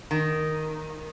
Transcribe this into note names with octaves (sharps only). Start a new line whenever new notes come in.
D#3